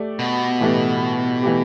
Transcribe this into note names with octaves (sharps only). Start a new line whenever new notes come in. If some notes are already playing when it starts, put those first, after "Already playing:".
Already playing: A3 G4 D5
B2
A2 E3 A3 G4
E3 A3 G4